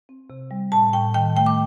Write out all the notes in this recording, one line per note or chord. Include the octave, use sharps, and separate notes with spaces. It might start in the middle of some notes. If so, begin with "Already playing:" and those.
C4
C3
G3
A2 A5
A2 G5
D#3 G5
A3 G5
D6